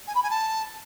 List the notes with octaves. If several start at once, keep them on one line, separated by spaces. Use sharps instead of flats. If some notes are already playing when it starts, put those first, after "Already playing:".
G#5
B5
G#5
A5